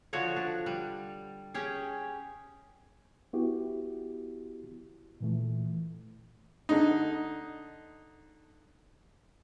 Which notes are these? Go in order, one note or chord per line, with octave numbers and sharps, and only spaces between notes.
D3 F3 F#4 C#5
D4
G3
C#4 G4 G#4
B3 E4 F#4 G4
A#2 E3 A3
D3 D#4